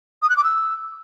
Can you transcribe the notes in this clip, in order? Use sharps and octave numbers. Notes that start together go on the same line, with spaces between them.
D#6
F#6
D6
E6